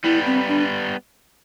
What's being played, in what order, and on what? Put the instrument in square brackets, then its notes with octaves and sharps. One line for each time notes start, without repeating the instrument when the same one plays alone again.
[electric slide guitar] G3 B3 [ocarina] E4
[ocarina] C4
D4